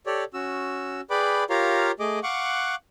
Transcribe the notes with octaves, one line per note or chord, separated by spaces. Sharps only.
G4 A4 C#5 D5
C#4 F#4 E6
G#4 B4 D5 G5 B5 D6
F4 G4 A#4 C#5 F5 A#5
A3 G#4 D#5 D6
F5 F#5 C#6 D6 F#6